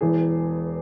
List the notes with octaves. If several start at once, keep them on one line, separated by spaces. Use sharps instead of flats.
E1 E2 E3 G#4